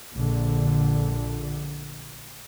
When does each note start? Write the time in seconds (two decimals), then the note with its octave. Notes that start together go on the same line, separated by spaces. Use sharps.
0.13 A#1 D3